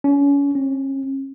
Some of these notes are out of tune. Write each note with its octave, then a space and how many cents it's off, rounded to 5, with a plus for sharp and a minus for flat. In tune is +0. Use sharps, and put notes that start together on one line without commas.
C#4 +30
C#4 -40